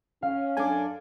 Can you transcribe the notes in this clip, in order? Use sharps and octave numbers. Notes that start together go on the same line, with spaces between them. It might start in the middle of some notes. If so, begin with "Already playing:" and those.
C#4 F5
F#2 D4 A4 G#5 D6